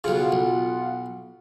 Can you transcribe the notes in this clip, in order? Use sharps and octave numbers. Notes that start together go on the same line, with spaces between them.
B1 C#3 F4 F#5
B1